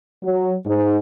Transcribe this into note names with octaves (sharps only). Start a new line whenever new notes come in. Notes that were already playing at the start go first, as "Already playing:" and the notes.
F#3
G#2